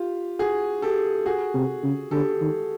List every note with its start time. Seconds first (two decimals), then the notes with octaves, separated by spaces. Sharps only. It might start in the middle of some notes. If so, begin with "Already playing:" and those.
Already playing: F4 G4
0.39 F#4 G#4
0.82 G4 A4
1.26 F#4 G#4
1.54 C3
1.83 C#3
2.11 D3 G4 A4
2.41 D#3